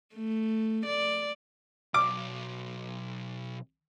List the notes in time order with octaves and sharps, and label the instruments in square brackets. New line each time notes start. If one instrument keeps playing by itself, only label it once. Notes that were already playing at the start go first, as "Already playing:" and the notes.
[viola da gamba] A3
D5
[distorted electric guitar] B1 [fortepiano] D6